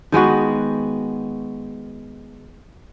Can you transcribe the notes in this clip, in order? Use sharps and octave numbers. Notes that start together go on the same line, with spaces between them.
D#3 G#3 B3 F#4